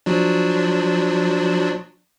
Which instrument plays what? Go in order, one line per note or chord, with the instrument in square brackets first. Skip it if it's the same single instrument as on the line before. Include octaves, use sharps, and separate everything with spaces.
[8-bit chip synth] F3 F#3 D4